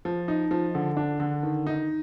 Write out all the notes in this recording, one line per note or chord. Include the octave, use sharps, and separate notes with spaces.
F3
D#4
F3
D3
D4
D3
D#3
D#4